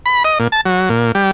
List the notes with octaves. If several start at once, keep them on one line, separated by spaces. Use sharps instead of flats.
B5
D#5
A#2
A5
F#3
A#2
G3